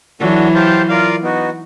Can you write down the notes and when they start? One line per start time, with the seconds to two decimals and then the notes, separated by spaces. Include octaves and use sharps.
0.20 E3 F#3 D4 F#4 A4
0.55 G4 C5 F5 A5
0.89 F4 A#4 D5 F5
1.23 B3 D#4 F#4